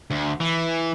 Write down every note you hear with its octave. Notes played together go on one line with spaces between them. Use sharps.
D2
E3